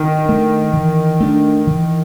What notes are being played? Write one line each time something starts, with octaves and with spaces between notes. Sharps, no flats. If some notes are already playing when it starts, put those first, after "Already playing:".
Already playing: D#3
A3 D4
E3
A3 D4
E3